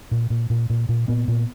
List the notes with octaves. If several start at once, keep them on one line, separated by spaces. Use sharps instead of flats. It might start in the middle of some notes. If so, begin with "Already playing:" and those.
A#2
A#2
A#2
A#2
A#2
A#2 B3
A#2